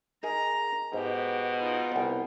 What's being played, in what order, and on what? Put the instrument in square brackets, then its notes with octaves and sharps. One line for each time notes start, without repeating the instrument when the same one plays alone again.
[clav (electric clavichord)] D#4 G#4 A#4 [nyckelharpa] A#5
[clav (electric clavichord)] G#2 [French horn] B2 [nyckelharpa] G4
[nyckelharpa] D#4 F4
[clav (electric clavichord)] C2 B3